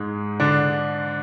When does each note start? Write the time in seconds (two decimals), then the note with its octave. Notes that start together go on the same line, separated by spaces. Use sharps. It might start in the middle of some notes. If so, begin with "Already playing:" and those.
Already playing: G#2 G#3
0.40 D3 D4